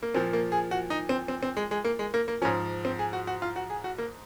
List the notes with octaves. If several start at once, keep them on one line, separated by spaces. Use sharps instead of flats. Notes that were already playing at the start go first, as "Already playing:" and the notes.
A#3
A#2 F3 C4
A#3
G#4
F#4
D#4
C4
C4
C4
G#3
G#3
A#3
G#3
A#3
A#3
G#2 F3 C#4
C4
G#4
F#4
F#4
F4
F#4
G#4
F#4
A#3